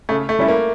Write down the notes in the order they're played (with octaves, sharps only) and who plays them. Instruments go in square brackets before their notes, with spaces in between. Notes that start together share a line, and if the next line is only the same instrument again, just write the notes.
[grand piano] C#3 [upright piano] A3
[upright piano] A3
[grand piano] G3 C#4 E4
[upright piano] A#3